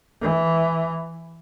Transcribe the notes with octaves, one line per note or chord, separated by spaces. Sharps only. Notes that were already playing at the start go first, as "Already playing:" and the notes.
E3